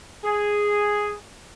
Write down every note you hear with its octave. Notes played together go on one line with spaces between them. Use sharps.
G#4